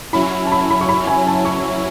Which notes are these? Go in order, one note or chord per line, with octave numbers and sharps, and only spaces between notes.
F#3 C#4 E4 B5
A5
B5
B5
C#6
B5
G#5
A5
C#6